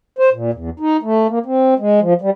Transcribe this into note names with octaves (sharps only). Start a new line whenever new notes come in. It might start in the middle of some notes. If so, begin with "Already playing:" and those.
C5
A#2
E2
D#4
A3
A#3
C4
G#3
F3
G3